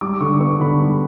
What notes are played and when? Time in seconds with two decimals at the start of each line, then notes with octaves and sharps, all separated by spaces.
0.01 G3 D6
0.20 D3 C#6
0.40 B3 C#6
0.60 D3 B5
0.80 G3